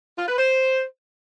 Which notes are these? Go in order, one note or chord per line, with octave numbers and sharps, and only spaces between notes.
F4
B4
C5